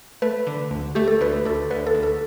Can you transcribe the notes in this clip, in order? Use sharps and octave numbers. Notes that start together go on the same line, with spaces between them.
A3 B4
D3
D2
A3 G4
A4
D2 B4
D2 A4
D2 B4
A4
D2
A4